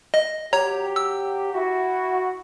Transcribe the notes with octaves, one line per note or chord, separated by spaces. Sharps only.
D#5
F#3 G4 C#5 A#5
E6
E4 F#4